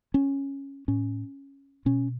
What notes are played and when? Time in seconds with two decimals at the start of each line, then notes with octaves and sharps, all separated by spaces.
0.14 C#4
0.88 A2 C#4
1.86 B2 C#4